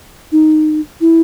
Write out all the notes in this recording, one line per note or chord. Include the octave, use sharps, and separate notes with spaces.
D#4
E4